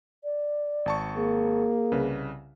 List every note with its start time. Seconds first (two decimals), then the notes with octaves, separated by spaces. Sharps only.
0.24 D5
0.86 G#1 A5 C#6
1.16 A#3 G#4
1.92 C2 C#3 B4